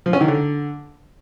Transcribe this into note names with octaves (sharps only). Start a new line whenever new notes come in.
F3
C#4
D#3
D3